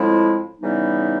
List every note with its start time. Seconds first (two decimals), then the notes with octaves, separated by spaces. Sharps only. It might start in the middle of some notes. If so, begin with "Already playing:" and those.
Already playing: A2 F3 G#3 C4 E4
0.59 C#3 E3 G3 B3 D#4